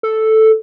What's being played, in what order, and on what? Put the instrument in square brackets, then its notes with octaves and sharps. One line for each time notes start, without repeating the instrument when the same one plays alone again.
[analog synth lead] A4